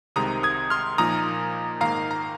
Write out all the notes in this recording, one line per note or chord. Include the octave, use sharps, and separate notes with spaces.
C2 C3 D#3 G#3 A#5 D#6
D#6 G#6
C6 F6
A#2 F3 A#3 D#4 A#5 D#6
G#2 D#3 A#3 F5 A#5
A#5